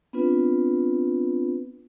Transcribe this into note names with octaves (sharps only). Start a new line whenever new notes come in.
B3 C4 D4 F4 B4